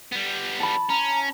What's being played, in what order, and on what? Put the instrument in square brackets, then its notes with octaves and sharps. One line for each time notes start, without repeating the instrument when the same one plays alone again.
[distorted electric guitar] G3 B3
[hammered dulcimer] A5 B5
[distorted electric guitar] C#4 [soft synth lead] A#5